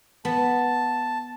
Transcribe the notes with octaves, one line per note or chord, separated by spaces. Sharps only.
B3 A5